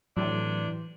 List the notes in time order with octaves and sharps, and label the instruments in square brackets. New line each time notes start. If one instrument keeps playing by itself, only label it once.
[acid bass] A2 [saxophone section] C3 D4 [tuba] E3 [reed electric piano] F#3